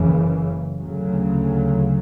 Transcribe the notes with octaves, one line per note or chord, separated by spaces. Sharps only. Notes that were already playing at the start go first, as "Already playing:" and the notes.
Already playing: F#1 F#2 C#3 E3
D2 C#3 F#3